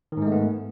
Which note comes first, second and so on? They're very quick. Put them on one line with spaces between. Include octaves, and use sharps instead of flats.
D#3 G#2 G#3 A3 B3